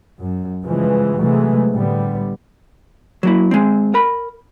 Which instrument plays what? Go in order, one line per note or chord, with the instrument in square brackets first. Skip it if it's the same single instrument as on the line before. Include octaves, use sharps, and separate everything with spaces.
[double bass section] F#2
G2 C#3 E3 F3 G#3
C3 E3 F#3 G#3 A3
A2 D3 G3 B3
[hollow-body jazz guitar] F#3 A#3 E4
G#3 C4
A#4 B5